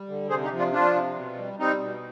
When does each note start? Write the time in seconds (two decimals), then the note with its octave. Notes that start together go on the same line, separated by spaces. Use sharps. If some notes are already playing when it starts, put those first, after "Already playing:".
Already playing: G3
0.09 D3
0.30 C3 G#4 C5
0.44 D#4 G4
0.51 F3
0.58 D4 F4
0.73 F3 D4 F4
0.95 C3
1.16 B2
1.37 G3
1.59 G3 C4 D#4
1.80 B2